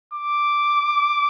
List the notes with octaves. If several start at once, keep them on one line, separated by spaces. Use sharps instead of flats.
D6